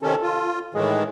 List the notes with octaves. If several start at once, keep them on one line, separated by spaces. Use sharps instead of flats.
C3 D#3 C#4 A4
F4
A2 D#3 E3 G#3